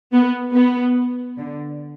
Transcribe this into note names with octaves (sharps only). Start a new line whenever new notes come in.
B3
B3
D3